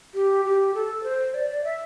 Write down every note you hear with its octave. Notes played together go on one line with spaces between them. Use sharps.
G4
G4
A4
C5
D5
E5